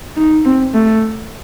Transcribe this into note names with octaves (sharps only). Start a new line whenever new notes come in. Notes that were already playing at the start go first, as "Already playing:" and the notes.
D#4
C4
A3